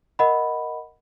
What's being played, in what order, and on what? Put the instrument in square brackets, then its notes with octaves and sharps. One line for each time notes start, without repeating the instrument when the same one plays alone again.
[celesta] A#4 D#5 F#5 B5